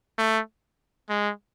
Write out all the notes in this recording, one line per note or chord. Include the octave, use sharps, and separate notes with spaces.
A3
G#3